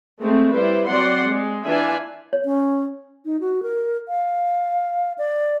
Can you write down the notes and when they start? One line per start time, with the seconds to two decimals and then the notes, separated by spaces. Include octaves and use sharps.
0.20 G#3 A3 C4
0.52 G3 E4 B4 C5
0.86 F#3 C4 D5 F#5 C6
1.26 G#3
1.65 E3 D4 F4 D5 E5 G#5
2.33 C#5
2.45 C#4
3.25 D#4
3.41 F#4
3.63 A#4
4.08 F5
5.18 D5